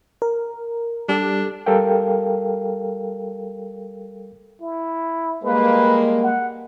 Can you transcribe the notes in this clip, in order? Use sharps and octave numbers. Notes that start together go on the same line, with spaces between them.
A#4
G3 D4 G4 A4
G3 A4 A#4 F5 G5
E4
G3 G#3 A#3 B4
F#5